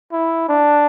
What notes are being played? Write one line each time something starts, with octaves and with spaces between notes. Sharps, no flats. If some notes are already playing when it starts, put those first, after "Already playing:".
E4
D4